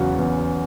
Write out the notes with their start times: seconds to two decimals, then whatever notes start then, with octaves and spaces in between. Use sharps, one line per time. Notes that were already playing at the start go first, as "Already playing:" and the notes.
Already playing: E2 C#3 F#3 C#4 F#4
0.19 E2